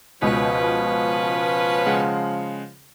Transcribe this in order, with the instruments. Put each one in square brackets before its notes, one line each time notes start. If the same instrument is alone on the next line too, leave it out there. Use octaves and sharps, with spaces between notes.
[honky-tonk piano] C#2 B2 [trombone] F3 [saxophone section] C#4 B4
[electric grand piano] C#3 G#3 F#5